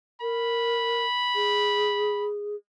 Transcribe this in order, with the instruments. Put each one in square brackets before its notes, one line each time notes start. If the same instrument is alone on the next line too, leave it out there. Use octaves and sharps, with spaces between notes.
[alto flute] A#4 [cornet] B5
[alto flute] G#4